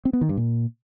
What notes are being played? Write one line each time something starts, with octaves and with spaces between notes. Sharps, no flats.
C4
B3
D#3
G2
A#2